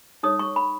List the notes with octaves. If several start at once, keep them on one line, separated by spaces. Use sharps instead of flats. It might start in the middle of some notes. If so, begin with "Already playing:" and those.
D#4 A4 C#5 D#6
C#6
B5